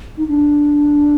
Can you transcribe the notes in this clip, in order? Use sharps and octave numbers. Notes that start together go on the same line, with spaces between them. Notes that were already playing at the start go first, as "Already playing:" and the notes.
D#4
D4